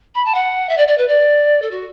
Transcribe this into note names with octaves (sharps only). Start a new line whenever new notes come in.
B5
A5
F#5
E5
D5
D5
B4
D5
A4
F#4